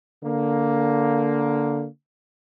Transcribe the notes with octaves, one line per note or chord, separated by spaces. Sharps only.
D3 A#3